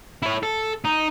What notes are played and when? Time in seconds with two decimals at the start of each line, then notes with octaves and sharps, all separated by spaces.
0.23 E4 C#5
0.43 A4
0.85 D#4